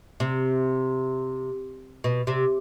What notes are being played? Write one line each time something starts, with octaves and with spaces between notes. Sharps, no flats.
C3
B2
C3